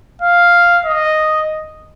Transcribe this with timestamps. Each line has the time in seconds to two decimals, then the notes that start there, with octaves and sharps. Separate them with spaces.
0.22 F5
0.85 D#5